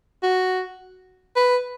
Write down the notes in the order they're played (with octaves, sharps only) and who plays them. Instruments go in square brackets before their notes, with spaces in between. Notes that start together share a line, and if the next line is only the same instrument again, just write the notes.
[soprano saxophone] F#4
B4